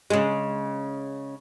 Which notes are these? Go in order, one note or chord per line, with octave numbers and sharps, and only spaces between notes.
C#3 G#3